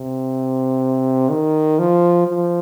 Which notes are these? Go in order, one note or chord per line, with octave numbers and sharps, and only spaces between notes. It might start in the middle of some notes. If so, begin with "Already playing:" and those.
Already playing: C3
D#3
F3
F3